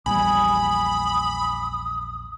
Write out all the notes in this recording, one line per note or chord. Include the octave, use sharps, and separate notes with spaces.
A#1 E2 G3 G#5 B5 D#6